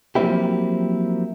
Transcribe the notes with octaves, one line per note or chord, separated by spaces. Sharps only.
F3 F#3 A#3 C4 E4 G4